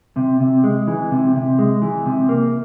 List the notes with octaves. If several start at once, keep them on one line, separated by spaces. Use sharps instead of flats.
C3
C3
G#3
E3
C3
C3
G#3
E3
C3
A#3